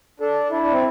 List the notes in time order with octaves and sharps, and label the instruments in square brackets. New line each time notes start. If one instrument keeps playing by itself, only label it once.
[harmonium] D4 [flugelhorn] A4
[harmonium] D4 [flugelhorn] E4
[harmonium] D4
C4